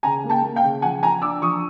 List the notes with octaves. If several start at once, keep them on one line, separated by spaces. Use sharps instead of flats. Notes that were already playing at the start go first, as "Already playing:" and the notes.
C#3 G#5 A#5
A#3
G5 A5
A#3
F5 G5
C#3
F3 F#5 G#5
F3 G#5 A#5
D4 D6 E6
F3 C#6 D#6